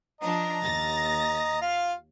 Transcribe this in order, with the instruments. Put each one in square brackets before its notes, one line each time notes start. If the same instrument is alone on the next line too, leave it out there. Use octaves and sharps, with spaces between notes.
[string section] F3 D4 [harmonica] D#5 A#5
[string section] D#2 A6 A#6
[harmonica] F4 F5